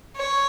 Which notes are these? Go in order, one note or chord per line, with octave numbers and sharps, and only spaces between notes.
C#5